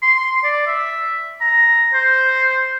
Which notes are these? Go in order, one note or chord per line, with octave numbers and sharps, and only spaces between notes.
C6
D5
E5
A#5
C5